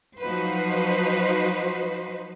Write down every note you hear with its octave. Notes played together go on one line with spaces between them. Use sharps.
F3 F#3 D#4 F#4 B4 C5